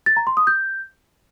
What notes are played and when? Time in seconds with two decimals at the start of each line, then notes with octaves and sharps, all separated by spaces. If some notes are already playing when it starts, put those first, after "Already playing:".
0.06 A6
0.17 A#5
0.27 C6
0.37 D#6
0.47 G6